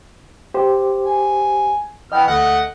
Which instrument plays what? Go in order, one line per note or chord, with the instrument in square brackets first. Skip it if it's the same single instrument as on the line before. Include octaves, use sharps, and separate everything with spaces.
[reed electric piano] G4 C5
[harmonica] G#5
[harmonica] E3 B3 F6 [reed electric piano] D#5 G5
[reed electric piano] D2 [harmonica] A3 D#5 F#5